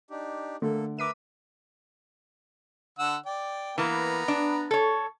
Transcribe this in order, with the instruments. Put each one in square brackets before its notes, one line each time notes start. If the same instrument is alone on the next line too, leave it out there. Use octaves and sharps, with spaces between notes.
[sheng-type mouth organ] D4 D#4 G4
[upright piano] D3 [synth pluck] A3 [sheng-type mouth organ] A#3 A4
[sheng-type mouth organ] A#4 B4 E5 [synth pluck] D6 B6 D#7
[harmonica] D3 F#5 E6
D5 G5
[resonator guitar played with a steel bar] E3 A#3 [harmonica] B3 A#5
[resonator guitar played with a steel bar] D4
A4 C#5